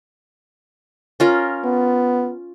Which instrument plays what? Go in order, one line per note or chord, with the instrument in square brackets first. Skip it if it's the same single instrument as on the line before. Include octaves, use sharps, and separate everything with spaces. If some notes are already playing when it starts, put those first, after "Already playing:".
[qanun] C#4 F4 A#4
[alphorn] B3